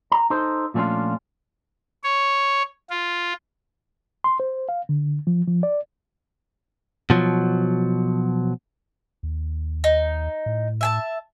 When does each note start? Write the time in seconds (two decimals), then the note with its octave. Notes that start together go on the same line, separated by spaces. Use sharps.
0.12 A#5
0.30 D#4 A4 C5
0.74 A#2 F3 A3 C#4 D4 F4
2.03 C#5
2.90 F4
4.24 C6
4.40 C5
4.69 F5
4.89 D3
5.27 F3
5.48 F3
5.63 D5
7.10 B2 F3 F#3
9.23 D#2
9.84 D#4
10.46 A2
10.81 E5 G#5 A5